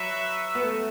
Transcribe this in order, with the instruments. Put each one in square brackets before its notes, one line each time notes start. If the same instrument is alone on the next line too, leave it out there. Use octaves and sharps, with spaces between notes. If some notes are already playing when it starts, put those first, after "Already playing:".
Already playing: [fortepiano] F#3 [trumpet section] F#4 B4 E5
[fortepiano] B3
A3